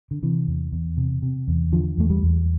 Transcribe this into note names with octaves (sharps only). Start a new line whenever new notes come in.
D3
C3 E3
E2
E2
C3
C3
E2
D3 F3
E2 A3
G3
E2